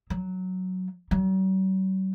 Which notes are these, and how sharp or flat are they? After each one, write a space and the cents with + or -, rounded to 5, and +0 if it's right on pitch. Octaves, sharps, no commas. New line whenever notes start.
F#3 +0
F#3 +45